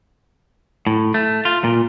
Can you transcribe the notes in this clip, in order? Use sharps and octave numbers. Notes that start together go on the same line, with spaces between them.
A2
A3
F4
A#2